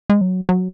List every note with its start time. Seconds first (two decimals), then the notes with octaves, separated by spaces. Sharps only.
0.10 G#3
0.21 F#3
0.49 F#3